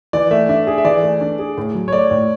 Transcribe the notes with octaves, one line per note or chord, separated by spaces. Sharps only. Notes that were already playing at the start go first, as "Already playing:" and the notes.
E3 D5
A3 E5
D4 E5
G#4
E5
E3 D5
A3
D4
G#4
A2
F#3
C#5
A3 D5
A2